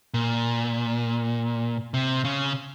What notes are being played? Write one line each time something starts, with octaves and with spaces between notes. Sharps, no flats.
A#2
C3
C#3